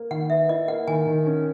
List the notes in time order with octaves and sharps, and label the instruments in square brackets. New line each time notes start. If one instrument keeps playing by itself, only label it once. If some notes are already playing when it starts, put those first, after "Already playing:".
Already playing: [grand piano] A#3
[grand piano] D#3 [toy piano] F#5
[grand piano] B4 [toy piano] E5
[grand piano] E4 [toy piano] D#5
[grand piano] A#3 [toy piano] F#5
[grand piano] D#3 [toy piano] G#5
[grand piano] D#3
C#4